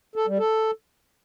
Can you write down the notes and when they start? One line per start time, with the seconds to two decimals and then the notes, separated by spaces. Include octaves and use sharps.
0.16 A4
0.27 G3
0.39 A4